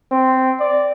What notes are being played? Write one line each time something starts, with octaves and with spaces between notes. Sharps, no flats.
C4
D5